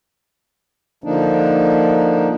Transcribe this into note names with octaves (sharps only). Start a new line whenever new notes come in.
D3 F3 A#3 D4 D#4